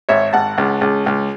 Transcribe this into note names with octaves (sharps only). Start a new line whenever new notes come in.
G#1 C#5 E5
G#1 F#5 A5
C#2
C#2
C#2